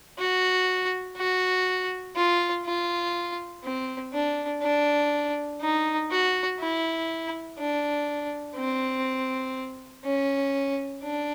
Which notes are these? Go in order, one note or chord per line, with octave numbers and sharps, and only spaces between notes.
F#4
F#4
F4
F4
C4
D4
D4
D#4
F#4
E4
D4
C4
C#4
D4